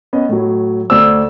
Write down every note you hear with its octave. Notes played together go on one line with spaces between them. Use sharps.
B3 C#4 D#5
A2 F#3
D2 C5 D5 E6